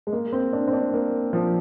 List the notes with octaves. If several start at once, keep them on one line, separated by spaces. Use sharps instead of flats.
G#3
A#3
C4
D4
C4
D4
A#3
F3